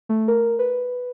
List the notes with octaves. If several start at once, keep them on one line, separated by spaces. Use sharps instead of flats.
A3
A#4
B4